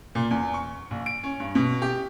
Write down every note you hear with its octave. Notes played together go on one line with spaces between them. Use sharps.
A#2
E2
C#6
A#1
D7
C#4
G2
B2
G4